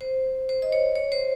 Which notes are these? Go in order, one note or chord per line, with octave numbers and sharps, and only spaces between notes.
C5
C5
D#5
C#5
C#5
C5